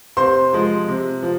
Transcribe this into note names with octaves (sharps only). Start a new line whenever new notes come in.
C3 C5 C6
F3 G#3
C3
F3